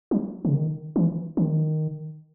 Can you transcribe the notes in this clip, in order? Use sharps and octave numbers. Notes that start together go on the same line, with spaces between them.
F#3
C#3
D#3
E3
D#3